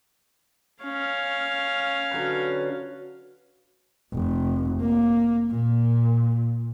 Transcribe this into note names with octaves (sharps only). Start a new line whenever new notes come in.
C#4 F5
D3 F#3 B4
F1
A#3
A#2